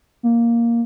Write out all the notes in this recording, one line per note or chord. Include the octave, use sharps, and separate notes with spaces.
A#3